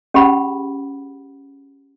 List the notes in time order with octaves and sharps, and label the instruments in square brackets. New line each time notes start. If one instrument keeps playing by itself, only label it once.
[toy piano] C#4 G4 G#4 F#5 B5